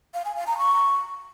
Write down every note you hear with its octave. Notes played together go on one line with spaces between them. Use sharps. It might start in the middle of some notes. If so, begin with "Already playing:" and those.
F5
G#5
F5
A#5
C#6